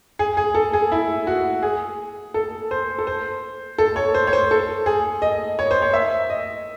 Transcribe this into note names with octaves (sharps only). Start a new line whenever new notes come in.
G#4
G#4
A4
G#4
E4
F#4
G#4
A4
C5
A4
C5
A4
C#5
C5
C#5
C5
A4
G#4
D#5
C#5
C5
C#5
E5
D#5